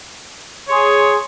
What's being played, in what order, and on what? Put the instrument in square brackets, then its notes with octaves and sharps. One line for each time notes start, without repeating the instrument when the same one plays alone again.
[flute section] G#4 C6 [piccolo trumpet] C#5